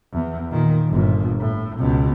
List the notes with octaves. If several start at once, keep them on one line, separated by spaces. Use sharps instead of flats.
E2
A#2 D#3
G1 A#2
A2
C#2 B2